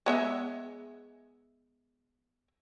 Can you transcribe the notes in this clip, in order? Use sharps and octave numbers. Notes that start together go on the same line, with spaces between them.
G#3 B3 E5